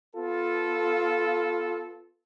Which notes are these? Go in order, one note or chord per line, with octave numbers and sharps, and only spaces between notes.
B3 F4 A4